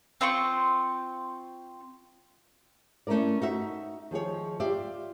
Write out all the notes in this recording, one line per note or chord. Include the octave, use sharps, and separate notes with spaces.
C4 F4 C5 C#6
A3 C#4 E4 A#4 D5
D#4 F#4 E5
D#3 F3 G#4 C#5
F4 G4 D5 E5